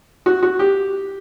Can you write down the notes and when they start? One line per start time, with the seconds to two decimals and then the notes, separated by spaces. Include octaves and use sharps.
0.26 F#4
0.43 F#4
0.59 G4